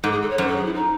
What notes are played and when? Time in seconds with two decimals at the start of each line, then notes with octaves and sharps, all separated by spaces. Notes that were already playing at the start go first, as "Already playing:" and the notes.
0.04 G#2 A4
0.12 G#4
0.21 A4
0.30 C#5
0.38 F#2 C5
0.47 A4
0.56 G#4
0.65 E4
0.74 D#4